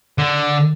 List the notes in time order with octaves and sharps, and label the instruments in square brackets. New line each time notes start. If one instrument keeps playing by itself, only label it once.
[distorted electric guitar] D3